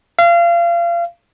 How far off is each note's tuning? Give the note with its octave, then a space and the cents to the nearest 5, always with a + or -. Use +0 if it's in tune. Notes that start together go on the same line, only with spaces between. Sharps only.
F5 -30